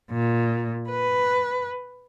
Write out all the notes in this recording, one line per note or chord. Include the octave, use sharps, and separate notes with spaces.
A#2
B4